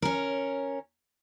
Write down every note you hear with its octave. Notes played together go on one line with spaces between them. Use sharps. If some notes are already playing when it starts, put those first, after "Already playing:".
C#4 A#4